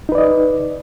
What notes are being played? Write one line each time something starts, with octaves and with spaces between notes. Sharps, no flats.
D#4 B4 D5 D#5